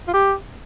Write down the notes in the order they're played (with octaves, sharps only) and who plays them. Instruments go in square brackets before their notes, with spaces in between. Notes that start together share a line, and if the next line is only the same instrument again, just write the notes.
[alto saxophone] F4
G4